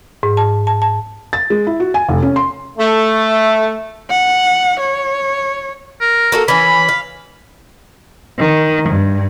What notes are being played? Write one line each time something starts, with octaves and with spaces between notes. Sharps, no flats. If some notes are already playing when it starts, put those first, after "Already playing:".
G#2
A5
A5
A5
A6
G#3
E4
F#4
G#5
F1
C#4
C6
A3
F#5
C#5
A#4
A#3 F#4 A4
E3 C#4 B5
F5
D#3
G2